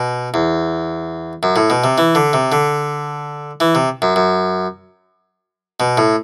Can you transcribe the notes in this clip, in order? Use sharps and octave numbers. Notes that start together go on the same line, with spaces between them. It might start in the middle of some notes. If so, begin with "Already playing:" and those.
Already playing: B2
E2
F#2
A2
B2
C3
E3
D3
C3
D3
E3
C3
F#2
F#2
B2
A2